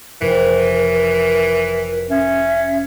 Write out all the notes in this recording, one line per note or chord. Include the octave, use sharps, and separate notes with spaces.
F1 F2 E3 A#4
C#4 E5